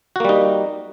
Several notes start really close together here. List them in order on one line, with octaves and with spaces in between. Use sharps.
F#4 A#3 G3 D#4